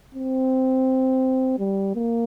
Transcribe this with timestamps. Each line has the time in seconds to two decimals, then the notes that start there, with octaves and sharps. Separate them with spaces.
0.15 C4
1.59 G3
1.95 A#3